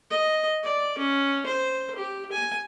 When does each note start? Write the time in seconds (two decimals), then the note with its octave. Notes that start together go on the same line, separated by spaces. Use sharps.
0.11 D#5
0.64 D5
0.98 C#4
1.46 C5
1.96 G4
2.32 G#5